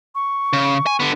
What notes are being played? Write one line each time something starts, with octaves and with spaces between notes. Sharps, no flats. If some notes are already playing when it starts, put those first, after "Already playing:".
C#6
C#3
G#5
D3 B3